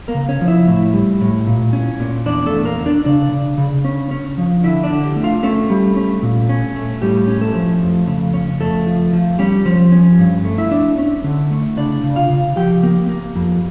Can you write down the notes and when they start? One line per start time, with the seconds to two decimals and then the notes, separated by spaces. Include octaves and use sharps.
0.08 A#3 A#4
0.15 C#3
0.29 C#4 C#5
0.41 F3
0.48 E4 E5
0.68 A2
0.94 G3
1.21 A2
1.47 A#2
1.73 C#4
2.00 A#2
2.26 E2 D4 D5
2.46 A3 A4
2.53 E2
2.65 A#3 A#4
2.79 D3
2.86 D4 D5
3.05 C#3 D4 D5
3.32 C#3
3.58 C#3
3.85 C#4
4.11 C#4
4.38 F3
4.64 D3 E4 E5
4.83 D4 D5
4.90 D3
5.03 G4 G5
5.16 A3
5.24 F4 F5
5.43 A3 C#4 A4
5.70 G3
5.97 C#4
6.23 A#2
6.49 C#4
6.76 A3
7.02 A2 G3 G4
7.28 C#4
7.41 A3 A4
7.55 F3
7.81 F2
8.07 C#3
8.34 C#4
8.60 F2 A3 A4
8.87 F3
9.13 F3
9.39 G3 C#4 G4
9.66 F3
9.92 C#4
10.19 G2
10.45 A3
10.58 E4 E5
10.71 D4
10.98 C#4
11.24 D3
11.51 A3
11.77 C#3 D4 D5
12.04 C#3
12.16 F4 F5
12.30 C#3
12.56 F3 G4 G5
12.83 A#3
13.09 A#3
13.36 F2